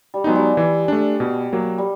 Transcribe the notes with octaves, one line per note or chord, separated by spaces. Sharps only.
G3
F#3 G#3 B3 D#4
G3
E3
A3 D4
B2
F#3 A#3
G3